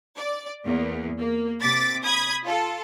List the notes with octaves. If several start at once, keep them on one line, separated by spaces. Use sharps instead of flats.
D5
E2 A#3
A#3
C3 D6 A6 B6
B5 D#6 G#6
F4 A4